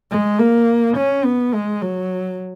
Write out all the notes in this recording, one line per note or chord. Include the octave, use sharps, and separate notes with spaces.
G#3
A#3
C#4
B3
G#3
F#3